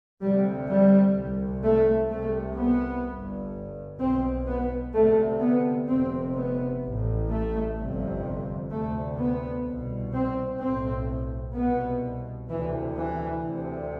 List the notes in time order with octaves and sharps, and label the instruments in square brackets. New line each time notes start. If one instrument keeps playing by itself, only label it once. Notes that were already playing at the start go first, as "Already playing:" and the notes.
[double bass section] D2 C3 G3
G3
C2 C3
A3
C2 C3 A3
B3
G1 G2
B1 B2 C4
B3
D2 C3 A3
B3
F1 F2 C3 C4
B3
A1 A2
A3
G1 F2 C3
D2 C3 A3
B3
C2 B2
C4
B1 A2 C4
C2 B2 B3
D2 C3 E3
E3
D2 C3